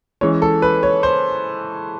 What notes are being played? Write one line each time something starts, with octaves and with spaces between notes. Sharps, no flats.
E3 G#3 C#4 C#5
A4
B4
C#5
C5